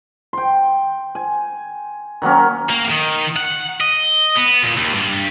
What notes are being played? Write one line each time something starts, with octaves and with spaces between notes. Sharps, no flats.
G5 C6
G#5
D#3 F#3 A#3 C#4
A#3
D#3
F#5
D#5
B3
A#2
D#2
G2